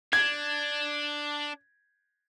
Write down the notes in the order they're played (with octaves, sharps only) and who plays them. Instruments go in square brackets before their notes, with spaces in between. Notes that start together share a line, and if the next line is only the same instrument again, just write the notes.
[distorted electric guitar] D4 [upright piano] G#6